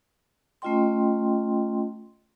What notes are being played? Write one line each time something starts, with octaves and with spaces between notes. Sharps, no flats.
A3 C#4 F4 D#5 G5 C6